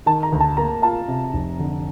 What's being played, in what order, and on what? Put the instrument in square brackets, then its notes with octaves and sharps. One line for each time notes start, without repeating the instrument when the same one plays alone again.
[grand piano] D#3 [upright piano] A5
[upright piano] A#5
[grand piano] D2
[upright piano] A5
[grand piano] A#3 [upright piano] A#5
[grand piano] F4 [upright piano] A5
[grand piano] C3
F1
D3